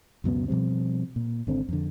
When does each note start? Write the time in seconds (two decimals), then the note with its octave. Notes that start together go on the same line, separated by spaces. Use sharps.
0.24 C#2 F#2 B2 B3
0.48 B2 F3 G3 C4
1.16 A#2
1.47 G#1 D3 C4
1.69 F2 D3